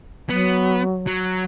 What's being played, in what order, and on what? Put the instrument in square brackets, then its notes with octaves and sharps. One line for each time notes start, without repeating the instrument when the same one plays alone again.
[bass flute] F#3 [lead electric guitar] B3
[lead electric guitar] F#3